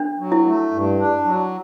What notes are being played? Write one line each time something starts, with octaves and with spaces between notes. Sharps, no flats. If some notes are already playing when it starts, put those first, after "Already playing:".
Already playing: D4
F#3
E4
A3
G2
D4
F#3